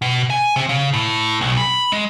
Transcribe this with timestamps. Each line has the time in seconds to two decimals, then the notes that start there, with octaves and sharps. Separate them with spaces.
0.02 B2
0.30 G#5
0.56 C3
0.69 C#3
0.94 A2
1.41 B1
1.58 B5
1.92 G#3